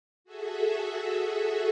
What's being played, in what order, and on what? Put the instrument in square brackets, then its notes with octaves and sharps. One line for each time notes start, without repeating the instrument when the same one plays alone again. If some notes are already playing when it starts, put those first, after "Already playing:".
[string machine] F#4 G#4 A4 E5